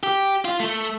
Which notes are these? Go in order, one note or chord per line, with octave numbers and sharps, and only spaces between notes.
G4
F4
A3